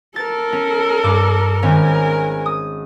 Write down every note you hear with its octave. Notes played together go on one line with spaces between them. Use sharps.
A4 A#4 A6
C#4
G2 D6 E7
G#1 C#4 A#4 G#5
D#6